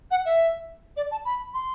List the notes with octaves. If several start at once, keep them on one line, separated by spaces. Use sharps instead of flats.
F#5
E5
D5
A5
B5
C6